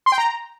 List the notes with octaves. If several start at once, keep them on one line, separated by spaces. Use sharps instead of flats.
C6
G5
A#5